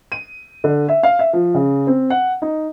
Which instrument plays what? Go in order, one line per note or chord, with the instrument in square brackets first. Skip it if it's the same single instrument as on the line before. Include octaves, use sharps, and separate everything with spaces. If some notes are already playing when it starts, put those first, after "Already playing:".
[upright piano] D#7
D3
E5
F5
E5
F3
C#3
C4
F#5
D#4